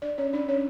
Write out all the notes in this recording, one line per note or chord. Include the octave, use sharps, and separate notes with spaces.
D4 D5
C#4 C#5
D4 D5
C#4 C#5